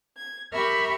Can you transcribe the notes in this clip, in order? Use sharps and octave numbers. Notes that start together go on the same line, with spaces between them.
G#6
G4 A#4 E5 B5 C#6 F6